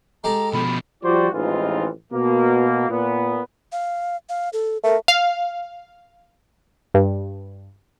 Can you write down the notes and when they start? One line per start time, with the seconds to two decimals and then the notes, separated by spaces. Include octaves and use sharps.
0.24 G#3 G4 A4 A#5
0.53 B2 F3 B5
1.03 F3 G3 F4 F#4 C5 D5
1.33 A1 F2 G#2 E3 D#4 F4
2.13 B2 A#3
2.89 A#2 B3
3.72 F5
4.29 F5
4.53 A4
4.84 A3 A#4
5.08 F5
6.94 G2